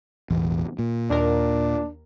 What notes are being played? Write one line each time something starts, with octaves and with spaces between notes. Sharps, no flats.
E1 A1 E2
A#2
D#2 D4 A#4